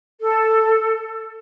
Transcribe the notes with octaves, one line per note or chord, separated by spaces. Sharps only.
A4